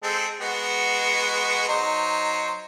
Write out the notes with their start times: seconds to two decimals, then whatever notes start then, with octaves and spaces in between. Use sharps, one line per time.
0.03 G#3 C4 A4
0.41 G#3 B3 F#4
1.69 F#3 D#4 C5